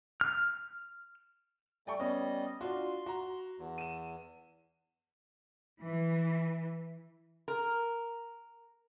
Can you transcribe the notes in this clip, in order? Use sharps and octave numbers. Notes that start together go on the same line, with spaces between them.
F6
G3 A3 D5 G5 C#6
G3 B3 C#4 D#5
D4 F4 F#4 C6
F#4 A#5
E2
D#7 E7
E3
A#4